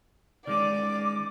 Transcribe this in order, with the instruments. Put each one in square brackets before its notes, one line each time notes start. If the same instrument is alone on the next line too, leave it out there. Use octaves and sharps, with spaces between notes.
[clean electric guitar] D#3 G#3 C#4 [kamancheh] D5 [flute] D6